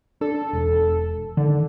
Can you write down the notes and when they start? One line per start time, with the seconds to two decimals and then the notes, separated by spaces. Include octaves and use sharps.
0.21 D4 A4
0.53 E1
1.37 D3 D#3